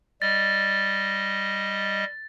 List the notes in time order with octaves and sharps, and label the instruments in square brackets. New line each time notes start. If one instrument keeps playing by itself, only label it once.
[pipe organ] G3 D#5 [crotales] A6